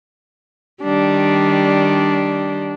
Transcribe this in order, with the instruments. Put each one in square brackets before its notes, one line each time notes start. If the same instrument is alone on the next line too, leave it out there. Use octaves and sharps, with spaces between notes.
[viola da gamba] D#3 G3 [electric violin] D4